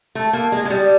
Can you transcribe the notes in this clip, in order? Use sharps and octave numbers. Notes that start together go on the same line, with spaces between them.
A3
A#3
G#3
G#3
G3